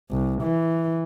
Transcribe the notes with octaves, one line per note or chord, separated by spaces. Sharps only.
C2
E3